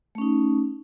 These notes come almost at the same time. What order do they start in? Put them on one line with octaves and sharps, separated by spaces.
A3 C#4 D#4